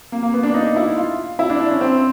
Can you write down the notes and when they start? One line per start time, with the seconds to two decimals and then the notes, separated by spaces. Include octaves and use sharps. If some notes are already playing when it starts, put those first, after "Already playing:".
0.12 A#3
0.23 A#3
0.34 B3
0.43 D4
0.54 D#4
0.76 E4
0.97 F4
1.39 E4
1.50 D4
1.60 D4
1.71 C#4
1.81 C4